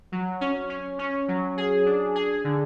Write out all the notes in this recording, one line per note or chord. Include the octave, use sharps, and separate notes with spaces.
F#3
C#4
C#4
C#4
F#3
G#4
D4
G#4
D3